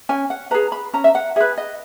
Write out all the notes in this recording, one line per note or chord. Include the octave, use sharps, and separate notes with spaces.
C#4 G#5
F#5
G#4 B4 A#5
B5
C#4 A#5
E5
F#5
G#4 B4 E5
D#5